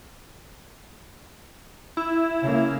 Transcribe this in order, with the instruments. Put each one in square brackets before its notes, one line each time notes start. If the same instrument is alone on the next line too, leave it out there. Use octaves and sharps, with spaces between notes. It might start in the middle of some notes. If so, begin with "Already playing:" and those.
[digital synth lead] E4
[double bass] C#3 A#3